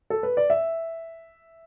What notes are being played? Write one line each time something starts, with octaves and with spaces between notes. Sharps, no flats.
A4
B4
D5
E5